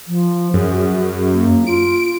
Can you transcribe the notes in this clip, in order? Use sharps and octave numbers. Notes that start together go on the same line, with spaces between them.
F3
F#2 G#4
A#3
F4 D7